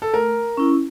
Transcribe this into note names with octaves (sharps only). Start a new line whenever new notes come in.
A4
A3 A#4
C#4 E4